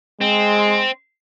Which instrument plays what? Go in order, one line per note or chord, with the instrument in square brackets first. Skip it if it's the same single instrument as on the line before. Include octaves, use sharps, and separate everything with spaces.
[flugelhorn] G#3 [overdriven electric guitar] C4